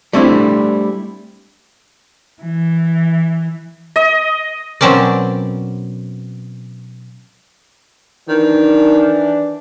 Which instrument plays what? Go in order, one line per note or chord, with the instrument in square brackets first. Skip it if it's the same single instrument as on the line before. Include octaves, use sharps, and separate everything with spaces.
[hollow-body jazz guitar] G3 A3 C4 D4 E4
[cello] E3
[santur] D#5
[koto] B2 F#3 C4 C#4 A#4 D5
[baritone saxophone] D#3 [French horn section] E3 D4